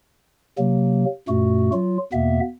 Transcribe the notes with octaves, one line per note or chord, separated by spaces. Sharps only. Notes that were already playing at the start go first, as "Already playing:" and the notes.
C3 F#3 A#3
F#2 A#2 A3 F#4
F#3 F4
E2 B2 A#3 B3 E5